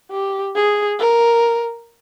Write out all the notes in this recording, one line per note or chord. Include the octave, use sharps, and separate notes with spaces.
G4
G#4
A#4